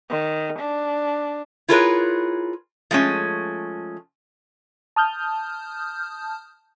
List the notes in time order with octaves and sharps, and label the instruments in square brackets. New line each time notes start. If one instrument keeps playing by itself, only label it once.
[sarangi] D#3
D4
[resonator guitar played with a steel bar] E4 F4 G#4 A#4 B4 C#5
F3 G#3 A3 C#4
[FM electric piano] A5 D#6 F6 G6